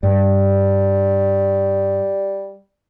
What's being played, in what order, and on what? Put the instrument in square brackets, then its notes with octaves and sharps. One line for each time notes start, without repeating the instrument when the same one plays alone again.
[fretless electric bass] G2 [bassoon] G3